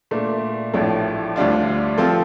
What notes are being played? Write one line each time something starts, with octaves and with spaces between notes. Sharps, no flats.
A#2 A3 D4
A1 A2 F3 A3 D4
D2 D3 G3 D4 F4
F3 C4 F4 A4